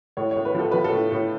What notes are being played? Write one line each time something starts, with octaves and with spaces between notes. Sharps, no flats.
A2 C#5
A2 C#5
B4
F3 A4
F3 B4
A4
A2
A2